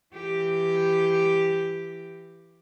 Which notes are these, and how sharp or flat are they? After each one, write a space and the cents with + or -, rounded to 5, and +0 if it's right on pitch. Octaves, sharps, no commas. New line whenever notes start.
E3 +20 G4 +0